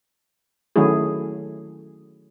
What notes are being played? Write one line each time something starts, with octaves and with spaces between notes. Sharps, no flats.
D#3 F#3 A3 C#4 E4 G#4